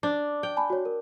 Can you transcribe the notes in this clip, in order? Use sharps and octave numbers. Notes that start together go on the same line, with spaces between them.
D4 D6
G5
G#5 A5 B5
F#4 C#5
A#4